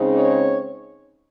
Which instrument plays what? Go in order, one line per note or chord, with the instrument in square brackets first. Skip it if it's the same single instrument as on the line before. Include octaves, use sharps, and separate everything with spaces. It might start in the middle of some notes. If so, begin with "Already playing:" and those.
Already playing: [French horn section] C#3 G#3 C4 D#4
C#5